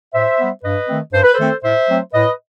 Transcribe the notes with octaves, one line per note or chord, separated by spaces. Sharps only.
A2 C5 E5
G3 B3
G2 B4 D#5
D#3 A3 C4
G2 C5
B4
A4 C5
D#3 A3 C4
A2 C5 E5
F#3 A3 C4
A2 B4 D#5